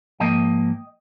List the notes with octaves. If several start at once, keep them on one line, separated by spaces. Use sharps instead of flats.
G#2 F3 A#3 D#5 G5